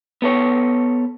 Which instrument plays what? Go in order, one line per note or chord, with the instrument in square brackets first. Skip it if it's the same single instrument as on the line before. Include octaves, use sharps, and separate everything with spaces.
[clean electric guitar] B3 A4 C#5